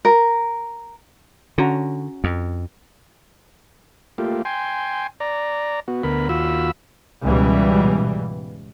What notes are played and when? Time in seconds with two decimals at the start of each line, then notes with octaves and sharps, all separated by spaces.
0.05 A#4
1.58 D3 C#4 F#4 A#5
2.24 F2
4.18 A3 A#3 F4 G4
4.45 G5 G#5 C6
5.20 D5 A#5
5.88 B3 F#4
6.03 D2 B3 A#4 B5
6.29 D#2 F4 F#4 B5 E6
7.23 C#2 G#2 B2 E3 G3